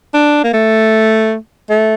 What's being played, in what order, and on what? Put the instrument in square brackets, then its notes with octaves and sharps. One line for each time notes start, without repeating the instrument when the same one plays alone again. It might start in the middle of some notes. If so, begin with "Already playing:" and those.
[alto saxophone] D4
A#3
A3
A3